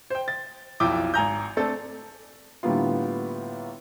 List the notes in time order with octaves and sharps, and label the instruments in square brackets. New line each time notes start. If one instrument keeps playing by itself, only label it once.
[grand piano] C5 G5
A6
B1 F2 E4 G5 D6
G#1 G#5 A#5 G6
A3 C4 D4 A4
[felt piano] A2 D3 G3 A#3 B3 F4